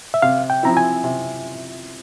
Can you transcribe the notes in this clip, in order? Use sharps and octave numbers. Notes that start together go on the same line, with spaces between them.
E5
C3 F5
G5
F3 C4 E4 A#5
G#5
C3